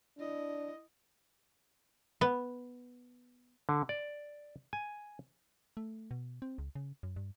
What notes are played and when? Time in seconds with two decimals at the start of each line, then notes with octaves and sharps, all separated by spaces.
0.18 D4 E4 D#5
2.21 B3
3.69 D3
3.89 D5
4.73 G#5
5.77 A3
6.11 B2
6.42 C4
6.58 C#2
6.75 C#3
7.03 F#2
7.16 G2